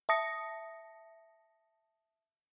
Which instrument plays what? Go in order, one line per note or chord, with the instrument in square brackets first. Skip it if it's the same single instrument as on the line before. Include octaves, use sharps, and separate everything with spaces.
[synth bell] E5 A5 D#6 A#6 C#7